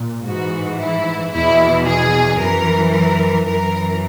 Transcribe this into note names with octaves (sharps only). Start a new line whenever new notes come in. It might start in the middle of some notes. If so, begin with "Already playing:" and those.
Already playing: A#2
G#2 E3 F#4
E4
E2 B2 E4
G#4
F#2 E3 A#4
A#4
F#2 E3 A#4